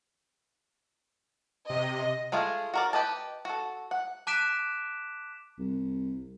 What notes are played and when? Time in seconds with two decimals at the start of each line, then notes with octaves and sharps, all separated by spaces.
1.70 C3 D#5
2.32 G#3 A3 F4 G#4
2.74 F#4 A#4 D5
2.93 G4 B4 D#5 A5
3.45 F#4 A4
3.91 F#5
4.27 A5 D6 F#6 B6 D7 E7
5.59 C2